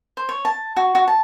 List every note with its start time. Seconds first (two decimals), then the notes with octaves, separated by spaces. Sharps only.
0.17 C5
0.29 C#5
0.45 A5
0.76 F#4
0.95 F#4
1.08 A5